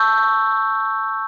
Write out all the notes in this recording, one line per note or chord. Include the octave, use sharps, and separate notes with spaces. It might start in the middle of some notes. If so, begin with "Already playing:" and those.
Already playing: A5 C#6 E6 G6